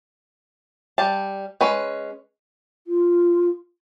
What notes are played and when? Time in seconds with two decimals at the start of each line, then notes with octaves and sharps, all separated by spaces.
0.98 G3 A5
1.61 G#3 C#4 B4
2.87 F4